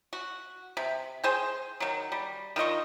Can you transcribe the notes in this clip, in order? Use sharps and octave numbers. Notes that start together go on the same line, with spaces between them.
F#4
C3
G#4 C5 G5
D#3 F#3
G3
D#3 F4 D#5 C#6